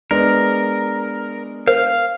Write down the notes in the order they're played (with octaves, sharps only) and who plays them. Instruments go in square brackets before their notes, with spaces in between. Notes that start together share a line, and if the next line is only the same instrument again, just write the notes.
[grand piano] G#3 B3 D4 [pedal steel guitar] A#4
[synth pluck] A#4 C5 [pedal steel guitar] F5